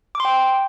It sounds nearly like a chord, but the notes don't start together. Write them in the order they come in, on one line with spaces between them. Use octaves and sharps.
D6 C6 G5